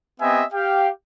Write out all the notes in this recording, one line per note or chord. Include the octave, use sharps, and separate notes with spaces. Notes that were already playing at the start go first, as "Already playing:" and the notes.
B3 C4 G4 D#5 E5 G#5
G4 F5 G5